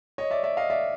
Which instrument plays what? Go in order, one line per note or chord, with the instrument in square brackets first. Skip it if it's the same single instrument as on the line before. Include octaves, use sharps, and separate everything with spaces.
[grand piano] C#5 D#5
D5 E5
D5 E5
D#5 F5
D5 E5